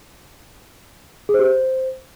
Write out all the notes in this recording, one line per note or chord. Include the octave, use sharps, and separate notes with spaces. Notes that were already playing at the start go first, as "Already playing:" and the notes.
G#4
C5
G4
C5